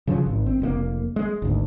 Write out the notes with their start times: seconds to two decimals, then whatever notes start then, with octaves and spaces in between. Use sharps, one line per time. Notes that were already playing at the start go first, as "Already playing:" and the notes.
0.07 C#3 F3 F#3
0.26 G#1
0.46 C4
0.62 F1 G#2 A#3
1.16 G#3
1.42 G#1 D2